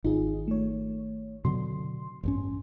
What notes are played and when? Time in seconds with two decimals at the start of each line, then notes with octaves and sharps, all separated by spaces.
0.04 G#1 D#4 F4 G#4
0.48 A3 C#5
1.45 B2 D3 F#3 C6
2.23 A1 G2 C#4